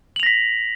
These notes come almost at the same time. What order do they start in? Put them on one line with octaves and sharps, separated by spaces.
F#7 F7 A#6 B6